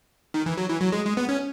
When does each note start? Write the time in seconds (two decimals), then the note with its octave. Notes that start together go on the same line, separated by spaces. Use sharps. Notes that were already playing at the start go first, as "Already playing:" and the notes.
0.34 D#3
0.46 E3
0.57 F#3
0.69 E3
0.81 F#3
0.92 G#3
1.05 G#3
1.17 B3
1.29 C#4